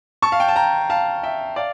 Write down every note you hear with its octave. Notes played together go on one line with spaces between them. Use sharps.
A5 C#6
F5
G5
A5
G5 A#5
F5 A5
E5 G5
D5 F5